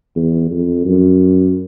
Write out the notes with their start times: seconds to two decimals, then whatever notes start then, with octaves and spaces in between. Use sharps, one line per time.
0.16 E2
0.51 F2
0.85 F#2